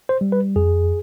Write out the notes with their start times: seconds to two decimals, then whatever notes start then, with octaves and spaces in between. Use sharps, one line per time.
0.09 C5
0.21 G3
0.32 B4
0.56 F2 G#4